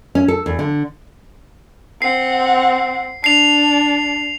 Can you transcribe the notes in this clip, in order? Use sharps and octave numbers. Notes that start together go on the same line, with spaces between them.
C#4
A4
E2
D3
C4 F#5 C7
D4 C7 F7